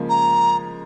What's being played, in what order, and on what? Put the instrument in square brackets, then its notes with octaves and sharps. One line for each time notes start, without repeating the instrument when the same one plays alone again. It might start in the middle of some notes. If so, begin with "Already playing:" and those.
Already playing: [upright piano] C#3 F3 G#3 A#3
[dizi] A#5